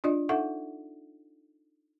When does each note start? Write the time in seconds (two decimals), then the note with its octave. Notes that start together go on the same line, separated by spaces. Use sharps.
0.04 D4 F4 D5 D#5
0.29 D#4 A4 E5 F#5 C#6